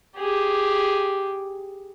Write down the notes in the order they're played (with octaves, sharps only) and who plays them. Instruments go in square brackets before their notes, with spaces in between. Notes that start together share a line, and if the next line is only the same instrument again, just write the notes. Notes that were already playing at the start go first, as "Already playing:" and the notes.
[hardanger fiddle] G4 G#4